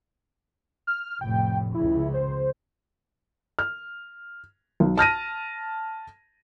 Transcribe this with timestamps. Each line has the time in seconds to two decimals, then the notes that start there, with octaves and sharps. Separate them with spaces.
0.87 F6
1.21 F1 A2 G5
1.74 C#2 C#3 E4
2.14 C5
3.59 F6
4.80 B1
4.97 A5 F6 A#6 D#7